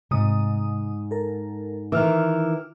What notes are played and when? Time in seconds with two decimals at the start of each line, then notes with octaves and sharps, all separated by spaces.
0.11 G#2 C3 D#6
1.11 A4 A#4
1.92 D#3 E3 D6 E6 F6